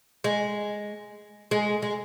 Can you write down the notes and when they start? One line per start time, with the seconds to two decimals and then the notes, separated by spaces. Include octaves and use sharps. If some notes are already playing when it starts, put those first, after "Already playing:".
0.24 G#3
1.51 G#3
1.82 G#3